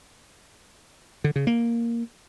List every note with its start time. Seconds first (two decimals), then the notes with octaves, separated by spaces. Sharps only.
1.24 D3
1.36 C#3
1.47 A#3